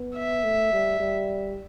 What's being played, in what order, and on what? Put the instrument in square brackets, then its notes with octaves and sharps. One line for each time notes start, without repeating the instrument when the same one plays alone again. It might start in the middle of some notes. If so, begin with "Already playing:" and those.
Already playing: [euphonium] B3
[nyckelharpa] E5
[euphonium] A3
G3
G3